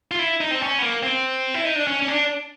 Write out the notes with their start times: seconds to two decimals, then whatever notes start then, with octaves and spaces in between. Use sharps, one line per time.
0.11 F4
0.19 E4
0.41 D#4
0.51 C4
0.61 C#4
0.79 B3
0.82 A#3
1.03 C4
1.54 E4
1.65 D#4
1.76 D4
1.87 C#4
2.02 C#4
2.08 D4